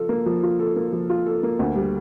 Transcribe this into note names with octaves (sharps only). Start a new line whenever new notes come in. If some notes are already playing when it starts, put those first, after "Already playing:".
Already playing: F3 F4 A4
A#3
F3
F4
A4
A#3
F3
F4
A4
A#3
D2
G3